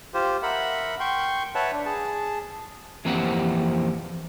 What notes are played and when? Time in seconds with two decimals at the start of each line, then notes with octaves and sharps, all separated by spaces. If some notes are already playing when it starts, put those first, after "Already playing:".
0.14 F4 G4 C5
0.43 A#4 E5 F#5 B5
1.00 G5 C6 C#6
1.55 B4 C#5 E5 F#5 A5
1.73 D4
1.85 G#4 A5
3.05 F2 E3 A#3 C4 G4 F#5